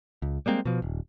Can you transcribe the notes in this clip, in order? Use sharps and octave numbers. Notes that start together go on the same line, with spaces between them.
C#2
G3 G#3 A#3 C4
B2 F3
D#1